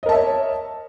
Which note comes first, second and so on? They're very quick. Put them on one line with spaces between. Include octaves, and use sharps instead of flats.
D#5 A#4 A5 E5 C#5